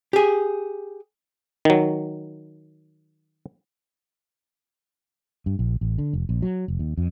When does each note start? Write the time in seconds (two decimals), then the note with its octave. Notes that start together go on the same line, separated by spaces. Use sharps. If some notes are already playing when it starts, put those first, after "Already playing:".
0.13 G4 G#4
1.65 D#3 F#3
5.46 G2
5.59 A#1
5.81 A1
5.98 D3
6.13 F1
6.29 A#1
6.42 F#3
6.68 F1
6.79 D#2
6.98 F2